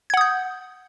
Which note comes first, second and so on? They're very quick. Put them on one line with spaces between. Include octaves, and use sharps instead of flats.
G#6 F#5 D#6 G6